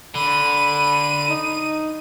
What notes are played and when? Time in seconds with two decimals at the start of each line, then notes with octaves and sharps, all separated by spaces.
0.15 D3 B5 D#7
1.30 D#4